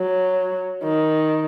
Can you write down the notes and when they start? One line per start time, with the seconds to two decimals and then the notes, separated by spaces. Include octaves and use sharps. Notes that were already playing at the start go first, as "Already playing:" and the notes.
Already playing: F#3
0.84 D#3